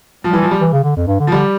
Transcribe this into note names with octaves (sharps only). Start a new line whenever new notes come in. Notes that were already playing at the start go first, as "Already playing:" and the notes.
F3 G3
E3
F3
G3
E3
C#3
D3
F2
G2
D3
F3
D3 G3